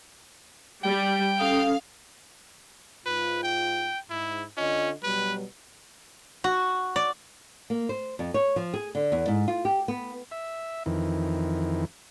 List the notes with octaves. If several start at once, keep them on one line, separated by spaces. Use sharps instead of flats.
G3 G5
C#4 A4 F5 D#6
G#2 F4 B4
G5
G#2 E4
D3 C#4 F4 D#5
B2 F#3 G3 B4
F#4
D5
A#3
C5
F2
C#5
F3
G#4
D3
E2
G#2
F4
G4
B3
E5
F2 D#3 E3